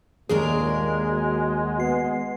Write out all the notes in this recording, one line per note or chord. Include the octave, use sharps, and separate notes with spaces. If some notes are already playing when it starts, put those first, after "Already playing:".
D#2 A#2 G#3 D4 G#4 A#4
F#4
B3 C7